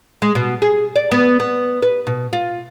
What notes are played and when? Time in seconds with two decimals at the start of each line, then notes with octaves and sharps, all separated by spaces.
0.22 G#3
0.35 B2
0.62 G#4
0.96 D5
1.12 B3
1.40 B3
1.82 B4
2.07 B2
2.33 F4